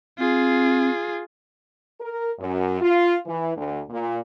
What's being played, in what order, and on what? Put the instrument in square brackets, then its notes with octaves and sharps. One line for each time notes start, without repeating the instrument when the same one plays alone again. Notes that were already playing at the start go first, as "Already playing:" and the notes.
[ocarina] C4 [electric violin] F4 G#4
[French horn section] A#4
F#2
F4
E3
D2
A#2